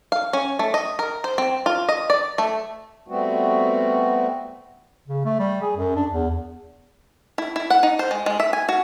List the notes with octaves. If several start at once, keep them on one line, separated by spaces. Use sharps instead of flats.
F5
C#4
A3
D#5
A#4
C5
C4
F4
D#5
D5
A3
G3 A3 B3 C4 F#4
C#3
A3
G3
G#4
F#2
D4
E2
E4
E4
F#5
D#4
C5
G#3
G#3
E5
G#5
F#4